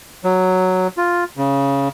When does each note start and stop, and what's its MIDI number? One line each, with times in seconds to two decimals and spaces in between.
0.24 0.87 54
0.97 1.24 65
1.37 1.88 49